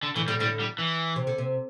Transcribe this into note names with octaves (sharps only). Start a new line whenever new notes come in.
D3
A2 D3 E3
A2 D3 G3
A2 D3 G3
G3
E3
C3
D3
C3